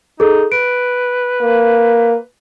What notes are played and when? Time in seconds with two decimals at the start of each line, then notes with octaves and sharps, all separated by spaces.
0.20 D#4 G#4 A4
0.52 B4 D7
1.42 A#3